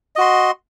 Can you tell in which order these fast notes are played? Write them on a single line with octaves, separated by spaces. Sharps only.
D#5 F#4 C6